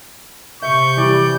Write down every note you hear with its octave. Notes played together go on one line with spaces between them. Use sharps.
C3 E5 C#6 G6
E3 G3 D5